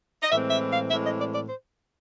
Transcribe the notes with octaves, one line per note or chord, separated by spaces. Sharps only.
D#5
A2 E3 G#3 C4 E5
E5
F5
A2 E3 G#3 C4 E5
D#5
D5
D5
C5